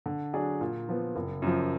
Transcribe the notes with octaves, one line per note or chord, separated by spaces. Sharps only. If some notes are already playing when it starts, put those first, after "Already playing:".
D3
F#3 D4 G#4 D5
A#2
F3 B3
F#1
F#2 F3